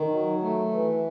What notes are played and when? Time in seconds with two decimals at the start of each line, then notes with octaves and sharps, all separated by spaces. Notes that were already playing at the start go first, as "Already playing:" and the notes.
Already playing: D#3
0.10 F#3
0.41 A3
0.72 E3